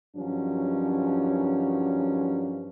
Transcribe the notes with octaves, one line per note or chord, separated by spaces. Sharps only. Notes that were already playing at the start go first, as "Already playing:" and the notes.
G2 D#3 F3 F#3 C#4